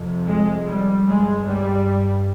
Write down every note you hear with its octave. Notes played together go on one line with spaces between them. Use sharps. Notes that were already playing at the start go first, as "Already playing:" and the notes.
Already playing: F2 C3
G#3
G3
G2 G#3
G3